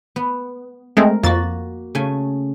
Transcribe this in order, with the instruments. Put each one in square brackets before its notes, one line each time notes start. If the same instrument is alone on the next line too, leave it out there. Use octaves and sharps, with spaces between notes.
[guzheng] B3
[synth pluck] G#3 A3 C4 [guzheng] A#4
[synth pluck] F2 A6 [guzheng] A#3 F#4
[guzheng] C#3 A3 G#5